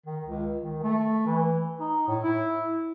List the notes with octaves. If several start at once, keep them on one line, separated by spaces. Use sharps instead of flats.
D#3
C#2
D#3
A3
E3
D#4
A2
E4